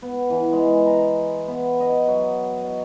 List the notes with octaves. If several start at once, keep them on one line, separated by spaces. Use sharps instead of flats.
B3
E3
G#3
A#5
B3
D#5
F#3
D#5